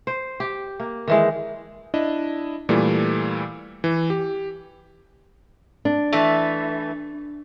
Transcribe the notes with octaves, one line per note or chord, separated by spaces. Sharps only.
C5
G4
A#3
D#3 E3 G#3
D4 E4 D#5
A#2 E3 G3 A3
E3
G4
D4
E3 A3